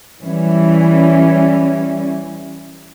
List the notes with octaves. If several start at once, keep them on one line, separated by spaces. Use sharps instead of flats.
E3 G3 C#4